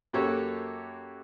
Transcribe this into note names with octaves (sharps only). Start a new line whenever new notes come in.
F#2 A#3 F#4 G4 A4 C#5